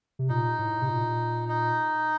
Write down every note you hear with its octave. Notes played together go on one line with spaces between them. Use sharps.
C3
A#2 D#4
A2
C3
A#2
D#4